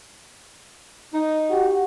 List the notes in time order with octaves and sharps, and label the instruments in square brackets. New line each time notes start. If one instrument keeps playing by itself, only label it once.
[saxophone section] D#4
[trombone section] F#4 G4